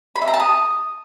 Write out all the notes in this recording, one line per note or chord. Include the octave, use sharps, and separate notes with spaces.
B5
E5
A#5
A5
D#6